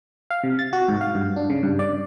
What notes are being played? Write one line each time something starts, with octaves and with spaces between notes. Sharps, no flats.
F5
C3
A6
F#4
G#2
F5
G2
D4
C#3
G2
D5